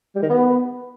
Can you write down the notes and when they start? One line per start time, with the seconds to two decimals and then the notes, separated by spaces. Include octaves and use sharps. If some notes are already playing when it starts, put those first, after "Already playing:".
0.15 G3
0.23 D#3
0.30 B3